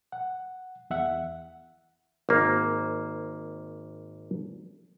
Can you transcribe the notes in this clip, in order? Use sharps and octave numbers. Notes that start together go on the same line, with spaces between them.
F#5
E2 E5 F#5
G#1 A#3